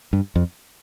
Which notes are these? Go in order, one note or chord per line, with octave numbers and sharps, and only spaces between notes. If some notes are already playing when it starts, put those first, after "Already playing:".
G2
F2